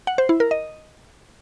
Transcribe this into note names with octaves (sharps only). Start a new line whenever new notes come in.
F#5
C5
E4
A#4
D#5